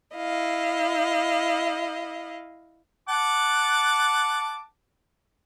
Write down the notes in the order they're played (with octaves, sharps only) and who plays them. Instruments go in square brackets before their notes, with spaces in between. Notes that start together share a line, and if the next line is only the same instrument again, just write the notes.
[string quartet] E4 D#5 F5
[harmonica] F#5 A5 D6